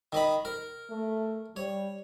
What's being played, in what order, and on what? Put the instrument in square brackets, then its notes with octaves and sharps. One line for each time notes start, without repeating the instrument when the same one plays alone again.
[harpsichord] D#3 D#5 B5
A#4
[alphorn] A3
[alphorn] G3 [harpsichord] C#5